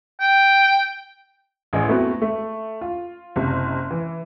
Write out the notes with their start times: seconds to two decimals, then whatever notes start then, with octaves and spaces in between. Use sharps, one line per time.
0.20 G5
1.73 A1 G#4 D#5
1.89 A3 B3 C4 F#4
2.22 A3
2.81 F4
3.36 F#1 C3
3.91 E3